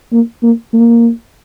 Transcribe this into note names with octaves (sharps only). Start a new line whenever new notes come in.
A#3
A#3
A#3